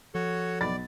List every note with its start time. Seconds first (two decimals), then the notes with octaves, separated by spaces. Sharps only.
0.15 F3 F#4 A4 C#5
0.61 B1 D5 B5 A6